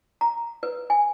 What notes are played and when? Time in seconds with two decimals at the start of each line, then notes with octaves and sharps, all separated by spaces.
0.21 A#5
0.63 B4
0.90 G#5